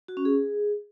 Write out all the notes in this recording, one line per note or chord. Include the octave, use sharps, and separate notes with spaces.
F#4
C#4
G#4